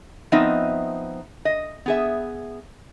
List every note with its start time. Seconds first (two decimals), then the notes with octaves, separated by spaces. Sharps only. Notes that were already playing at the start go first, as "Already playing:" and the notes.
0.32 F3 B3 C4 D#4 D#5 E5
1.45 D#5
1.86 B3 G#4 E5